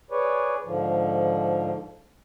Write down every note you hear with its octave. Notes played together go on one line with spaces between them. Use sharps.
G#4 B4 C#5 D5
G#2 D3 F3